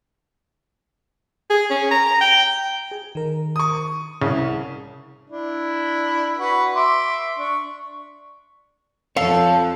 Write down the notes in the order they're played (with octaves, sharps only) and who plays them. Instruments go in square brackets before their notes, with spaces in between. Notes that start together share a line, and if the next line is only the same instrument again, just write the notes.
[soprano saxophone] G#4
C#4
A#5
A#5
G5
[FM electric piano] G#4
D#3 A#4
[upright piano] C#6 D#6
[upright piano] C2 [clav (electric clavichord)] C#3
[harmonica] D4 E4
F#4 B4
E5 C6 D6
D4 C#6
[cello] F2 F3 [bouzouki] A4 [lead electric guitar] C#5 F5